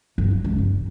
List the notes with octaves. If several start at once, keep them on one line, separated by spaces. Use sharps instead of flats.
G1
F3
C#2
G2
B1